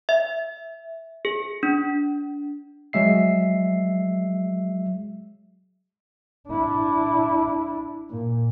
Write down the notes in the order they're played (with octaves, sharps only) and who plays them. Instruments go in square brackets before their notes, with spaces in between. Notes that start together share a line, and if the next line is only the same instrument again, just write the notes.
[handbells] E5
G#4
D4
[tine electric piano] F#3 G#3 E5 C7
[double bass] D4 E4
A#2